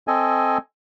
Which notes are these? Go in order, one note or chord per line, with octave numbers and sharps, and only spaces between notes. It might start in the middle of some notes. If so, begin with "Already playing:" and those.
C4 A4 D#5 G#5